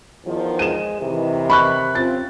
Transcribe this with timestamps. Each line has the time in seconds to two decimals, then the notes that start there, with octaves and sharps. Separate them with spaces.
0.25 E2 D#3 F3
0.59 G#3 D#7 E7
1.01 C3 D#3 E3
1.50 B5 C#6 F#6
1.95 C4 C#4 F4 A6